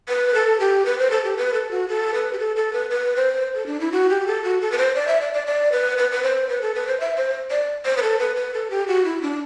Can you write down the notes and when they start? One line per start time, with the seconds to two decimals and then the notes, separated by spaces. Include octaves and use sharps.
0.08 B4
0.35 A4
0.60 G4
0.85 B4
0.98 C5
1.11 A4
1.24 G4
1.37 B4
1.54 A4
1.71 F#4
1.89 A4
2.14 B4
2.33 G4
2.39 A4
2.56 A4
2.73 B4
2.90 B4
3.16 C5
3.55 A4
3.67 D4
3.80 E4
3.92 F#4
4.10 G4
4.27 A4
4.44 F#4
4.61 A4
4.72 B4
4.78 C5
4.95 D5
5.08 E5
5.21 D5
5.34 D5
5.47 D5
5.72 B4
5.98 B4
6.12 B4
6.23 C5
6.49 B4
6.62 A4
6.75 B4
6.87 C5
7.00 E5
7.16 C5
7.51 D5
7.85 C5
7.97 B4
8.03 A4
8.19 B4
8.36 B4
8.54 A4
8.71 G4
8.88 F#4
9.05 E4
9.22 D4